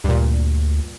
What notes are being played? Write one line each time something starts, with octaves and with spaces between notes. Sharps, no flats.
D2 G2 A#2